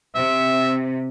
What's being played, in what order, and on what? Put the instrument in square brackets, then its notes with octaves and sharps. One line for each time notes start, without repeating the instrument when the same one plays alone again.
[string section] C3 [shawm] E5